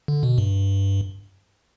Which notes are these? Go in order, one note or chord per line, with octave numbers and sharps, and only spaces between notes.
D3
B2
G2